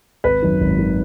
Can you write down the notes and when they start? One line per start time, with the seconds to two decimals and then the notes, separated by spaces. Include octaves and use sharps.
0.24 G#1 B4
0.42 F#2 D#3
0.60 G#1
0.79 D#3